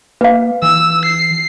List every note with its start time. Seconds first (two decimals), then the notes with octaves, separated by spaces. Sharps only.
0.21 A#3 B4 F5
0.62 E3 E6
1.05 C7